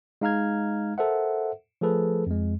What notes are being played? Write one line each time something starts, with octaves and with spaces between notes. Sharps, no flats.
G#3 D#4 F5 A#5 F6 G#6
A4 A#4 C5 E5 F#5
F3 A3 G#4 A4 B4
F2 G#3